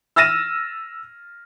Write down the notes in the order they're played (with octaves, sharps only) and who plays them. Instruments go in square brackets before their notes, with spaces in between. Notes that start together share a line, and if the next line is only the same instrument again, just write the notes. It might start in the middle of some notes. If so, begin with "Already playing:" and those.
[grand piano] E6 F6 A6 A#6 D#7 E7